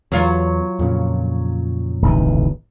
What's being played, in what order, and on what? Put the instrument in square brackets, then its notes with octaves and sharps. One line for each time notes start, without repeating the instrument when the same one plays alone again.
[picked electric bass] E2 [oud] F#3 F4 C#5
[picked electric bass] F2 A#2 C#3
[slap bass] D1 B1 E3